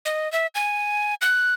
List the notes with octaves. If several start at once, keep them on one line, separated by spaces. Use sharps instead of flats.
D#5
E5
G#5
F#6